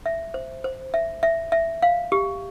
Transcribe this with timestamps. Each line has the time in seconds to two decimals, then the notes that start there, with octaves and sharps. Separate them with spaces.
0.06 E5
0.34 C5
0.64 C5
0.94 E5
1.23 E5
1.52 E5
1.82 F5
2.12 G4